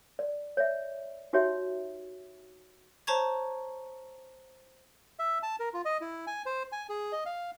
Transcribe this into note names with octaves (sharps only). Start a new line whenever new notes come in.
D5
C#5 D5 E5
D#4 F#4 G4 C#5 E5
C5 C#5 A5 A#5 C#6 G#6
E5
A5
A#4
F4
D#5
E4
G#5
C5
G#5
G#4
D#5
F5